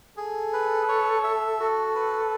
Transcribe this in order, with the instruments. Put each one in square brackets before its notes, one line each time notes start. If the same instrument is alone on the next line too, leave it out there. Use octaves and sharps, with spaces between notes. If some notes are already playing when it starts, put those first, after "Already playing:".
[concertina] G#4 [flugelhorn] A4
[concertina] B4
C#5
E5
[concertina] F#4 [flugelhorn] A4
[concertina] B4